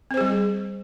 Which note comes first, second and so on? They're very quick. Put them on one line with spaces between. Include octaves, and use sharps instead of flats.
C4 C5 G#4 G3